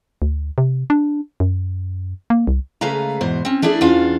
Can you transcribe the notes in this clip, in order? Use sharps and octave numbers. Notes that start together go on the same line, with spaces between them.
D2
C3
D4
F#2
A#3
C2
C#3 G#3 A3 B4 F5 A#5
E2 G#2 B2 C5
C4 C#4
A3 D4 E4 G#4 D5
E2 C#4 D4 F4 F5